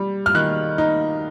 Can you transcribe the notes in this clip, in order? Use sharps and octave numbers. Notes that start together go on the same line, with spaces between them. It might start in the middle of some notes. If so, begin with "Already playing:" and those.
Already playing: G3
F6
D#3 F#6
D#4